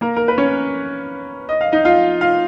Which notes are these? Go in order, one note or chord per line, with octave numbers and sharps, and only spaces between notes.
A#3 A#4
A#4
B4
C#4 C#5
D#5
F5
D#4 D#5
F4 F5
F4 F5